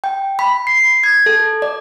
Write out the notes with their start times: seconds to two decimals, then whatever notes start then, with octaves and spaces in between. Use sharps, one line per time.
0.04 G5
0.39 B5
0.67 C7
1.04 G#6
1.26 A4
1.62 D5